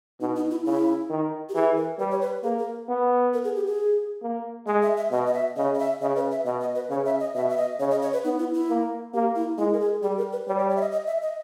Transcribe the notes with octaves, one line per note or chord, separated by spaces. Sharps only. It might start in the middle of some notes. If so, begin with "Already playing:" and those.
B2 D#4
D#4
E4
C#3 E4
D#3
G4
E3 G#4
A#4
G3 B4
C#5
B4
A#3 G#4
A#4
B3
A#4
G#4
G4
G#4
A#3
G#3 D#5
E5
E5
B2 D#5
D#5
E5
C#3 D#5
D#5
E5
C#3 D#5
B4
E5
B2 D#5
D#5
B4
C#3 C#5
E5
D#5
B2 E5
E5
D#5
C#3 C#5
D#5
C#5
B4
B3 D#4
E4
E4
A#3
A#3 G4
E4
G#3 E4
A#4
G#4
G3 G#4
A#4
B4
G3 C#5
C#5
C#5
E5
D#5
D#5
E5
D#5